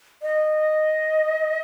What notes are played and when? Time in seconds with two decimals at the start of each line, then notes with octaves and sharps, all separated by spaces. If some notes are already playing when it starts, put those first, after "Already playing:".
0.22 D#5